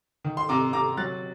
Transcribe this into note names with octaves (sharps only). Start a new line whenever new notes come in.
D#3
C6
C3 A#5 D6
C3 A#5 D6
F#3 F#6 A6